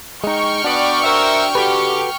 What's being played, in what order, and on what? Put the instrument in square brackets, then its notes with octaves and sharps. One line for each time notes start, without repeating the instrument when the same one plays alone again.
[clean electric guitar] G#3 D#4 [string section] G5 C#6 F6
[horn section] B3 D5 [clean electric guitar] D4 F#4
[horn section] A#4 C5 E5
[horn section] D3 G4 [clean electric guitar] F#4 A4 B4